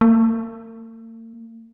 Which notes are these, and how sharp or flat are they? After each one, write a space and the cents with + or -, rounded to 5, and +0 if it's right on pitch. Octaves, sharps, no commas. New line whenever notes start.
A#3 -45